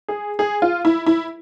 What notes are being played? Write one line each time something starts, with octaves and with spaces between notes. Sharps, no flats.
G#4
G#4
F4
E4
E4